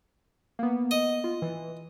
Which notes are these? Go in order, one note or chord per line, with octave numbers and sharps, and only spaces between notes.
A#3 B3
D#5
F4
E3